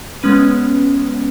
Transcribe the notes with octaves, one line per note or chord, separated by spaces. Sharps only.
G#3 B3 C#4 B4